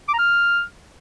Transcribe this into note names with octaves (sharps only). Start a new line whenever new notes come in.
D6
A#5
F6